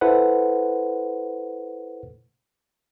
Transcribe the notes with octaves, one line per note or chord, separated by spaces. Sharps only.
E4 A4 B4 C5 F#5